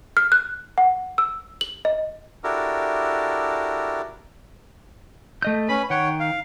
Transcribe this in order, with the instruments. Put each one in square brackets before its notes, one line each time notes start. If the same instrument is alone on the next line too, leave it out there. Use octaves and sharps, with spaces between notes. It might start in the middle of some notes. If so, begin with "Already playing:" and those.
[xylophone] F6
F#6
F#5
E6
F#7
D#5
[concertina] D4 E4 F#4 G4 A4 A#4
[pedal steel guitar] A3 D#5 G6
[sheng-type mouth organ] C#4 B5 [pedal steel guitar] B4
[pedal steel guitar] D#3 G5 [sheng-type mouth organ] C#5 F#5
[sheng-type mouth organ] F5